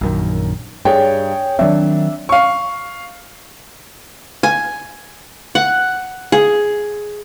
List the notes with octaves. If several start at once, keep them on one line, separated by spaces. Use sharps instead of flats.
A#1 F#2 D#3
G2 G#4 C#5 G5
D#3 F#3 C4 D4 E5
F5 C#6
G#5
F#5
G#4